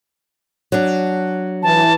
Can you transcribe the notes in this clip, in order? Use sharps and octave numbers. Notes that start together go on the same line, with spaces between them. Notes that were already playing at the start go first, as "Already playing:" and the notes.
F#3 D4
E3 A5